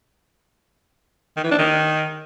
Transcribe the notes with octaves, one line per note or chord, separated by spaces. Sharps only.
D#3
E3
D4
D#3